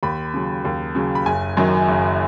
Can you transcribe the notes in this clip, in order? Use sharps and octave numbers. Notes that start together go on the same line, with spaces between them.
D#2 B5
C#3 F#3
D#2
C#3 F#3
B5
F#1 G#5
F#2 D#3 F#3
F#1